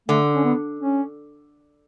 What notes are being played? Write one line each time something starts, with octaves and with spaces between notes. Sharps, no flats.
D3 A3
C#4
B3
C#4